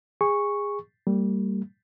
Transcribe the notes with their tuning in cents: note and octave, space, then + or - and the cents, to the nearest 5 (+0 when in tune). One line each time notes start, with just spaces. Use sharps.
G#4 -20 C#6 -5
G3 -10 A#3 -40